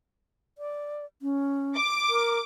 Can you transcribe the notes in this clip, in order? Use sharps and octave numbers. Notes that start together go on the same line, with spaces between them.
D5
C#4
D6
A#4